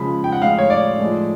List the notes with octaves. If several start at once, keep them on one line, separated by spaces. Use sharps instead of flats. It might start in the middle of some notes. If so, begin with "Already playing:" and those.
Already playing: C#3 F3 G#3 B5
G5
F#5
A2 F3 G#3 F5
C#5
D5
A2 F3 G#3